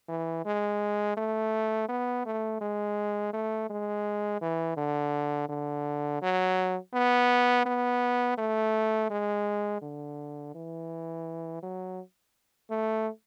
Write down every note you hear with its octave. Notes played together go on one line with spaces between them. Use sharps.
E3
G#3
A3
B3
A3
G#3
A3
G#3
E3
D3
D3
F#3
B3
B3
A3
G#3
D3
E3
F#3
A3